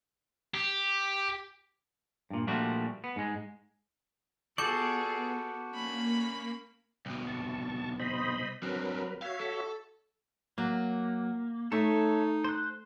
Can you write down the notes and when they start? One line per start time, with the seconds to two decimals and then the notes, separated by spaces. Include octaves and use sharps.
0.54 G4
2.30 G2 A#2
2.47 A#2 F3 G3 A3 D4 F#4
3.04 B3
3.16 G#2 G#3
4.58 B3 F4 F#4 G#4 A4 D5 C#6 G6
5.72 A#3 C#4 B5
7.06 C2 B2
7.27 A5 C#6
8.00 C5 D#5 B5
8.63 F#3 C4 D4 A#4 B4
9.22 F#4 C#5 E5 F5
9.40 A4
10.58 F#3 A#3
11.72 A3 D#4 A4 C#5 E5
12.44 C5 F#6